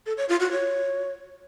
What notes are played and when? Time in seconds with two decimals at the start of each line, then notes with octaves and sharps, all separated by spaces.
0.06 A4
0.18 C#5
0.29 F4
0.40 F#4
0.51 C#5